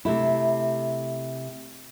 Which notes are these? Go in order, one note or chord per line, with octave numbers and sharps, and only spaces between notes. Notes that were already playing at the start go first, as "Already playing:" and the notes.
C3 A3 E4